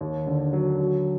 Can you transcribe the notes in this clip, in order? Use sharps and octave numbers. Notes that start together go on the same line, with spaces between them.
D#2
D3
F#3
F#3